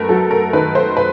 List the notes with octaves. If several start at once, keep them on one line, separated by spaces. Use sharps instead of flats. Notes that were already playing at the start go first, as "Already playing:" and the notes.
Already playing: F#2 A3 A#4 B4
F#3 A4
A#4
D#3 B4
C5
B4